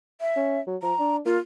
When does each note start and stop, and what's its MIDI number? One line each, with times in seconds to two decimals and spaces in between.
0.21 0.61 76
0.37 0.59 61
0.67 0.76 54
0.83 0.93 53
0.83 1.16 82
0.99 1.19 62
1.25 1.37 58
1.25 1.39 65